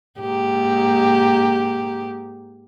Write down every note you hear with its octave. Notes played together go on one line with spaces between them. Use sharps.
G#2 A#3 G4